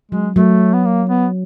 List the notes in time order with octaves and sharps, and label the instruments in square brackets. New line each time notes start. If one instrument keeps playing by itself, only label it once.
[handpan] F#3 [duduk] G#3
[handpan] F#3 [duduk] A3
[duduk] B3
A#3
B3